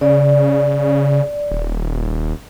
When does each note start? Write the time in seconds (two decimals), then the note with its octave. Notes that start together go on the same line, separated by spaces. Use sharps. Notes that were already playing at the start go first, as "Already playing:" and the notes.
0.01 C#3 D5
1.51 D#1